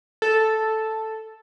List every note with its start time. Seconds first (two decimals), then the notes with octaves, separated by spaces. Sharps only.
0.22 A4